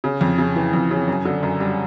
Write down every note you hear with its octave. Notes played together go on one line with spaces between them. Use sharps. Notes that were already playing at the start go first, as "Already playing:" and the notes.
C#3
F2
C#3
E3
F2
C#3
F#2
D3
F#2
G3